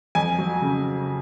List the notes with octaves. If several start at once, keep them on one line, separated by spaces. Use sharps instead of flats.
F2 G#5
F#3
C#3